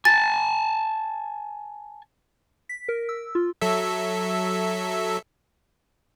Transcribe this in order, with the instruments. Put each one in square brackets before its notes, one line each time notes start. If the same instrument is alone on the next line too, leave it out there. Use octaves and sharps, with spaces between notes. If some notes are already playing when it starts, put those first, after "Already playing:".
[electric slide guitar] G#5 A5 [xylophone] A6
[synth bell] B6
A#4
E6
F4
[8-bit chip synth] F#3 A4 E5